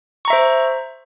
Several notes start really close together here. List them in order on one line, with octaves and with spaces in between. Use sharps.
C#6 A#5 E5 C5